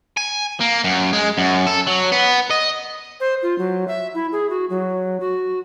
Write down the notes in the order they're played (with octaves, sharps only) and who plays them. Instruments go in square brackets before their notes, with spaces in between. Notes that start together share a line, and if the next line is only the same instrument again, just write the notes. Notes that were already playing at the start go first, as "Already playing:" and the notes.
[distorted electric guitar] G#5
A#3
F#2
G#3
F#2
A4
F#3
B3
D#5
[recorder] C5
F4
F#3
E5
E4
G#4
F#4
F#3
F#4